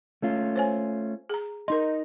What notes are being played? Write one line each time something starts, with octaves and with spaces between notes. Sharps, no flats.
A3 C#4 F4
C5 C#5 G#5
G#4 A#5
D#4 A#4 D#5 C6